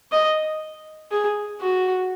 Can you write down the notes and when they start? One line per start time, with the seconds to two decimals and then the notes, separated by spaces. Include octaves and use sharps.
0.12 D#5
1.12 G#4
1.61 F#4